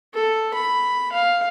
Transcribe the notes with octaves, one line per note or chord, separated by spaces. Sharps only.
A4
B5
F5